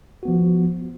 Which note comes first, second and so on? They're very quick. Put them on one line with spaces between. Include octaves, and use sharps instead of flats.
F#4 B3 F3